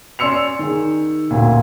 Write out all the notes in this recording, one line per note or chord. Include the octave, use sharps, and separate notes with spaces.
C#4 D5 C6 E6 C#7 F7
D#3 G#4
A1 D2 A#2